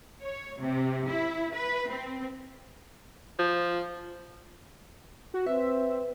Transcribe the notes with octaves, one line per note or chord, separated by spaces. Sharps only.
C#5
C3
E4
B4
C4
F3
F#4
C4 B4 E5